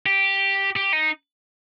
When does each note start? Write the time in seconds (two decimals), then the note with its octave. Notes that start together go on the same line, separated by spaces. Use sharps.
0.06 G4
0.76 G4
0.93 D#4